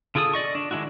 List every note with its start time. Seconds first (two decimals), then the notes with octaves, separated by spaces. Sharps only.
0.15 D3 F4 G#4 A4 D#6
0.33 D5 D#5 C#6
0.55 D4
0.71 D#3 G#3 D4 E4 F#4